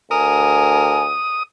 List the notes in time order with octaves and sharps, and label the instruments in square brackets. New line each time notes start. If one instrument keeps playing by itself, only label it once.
[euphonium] D2 [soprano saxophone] A#4 [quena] G#5 [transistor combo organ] D#6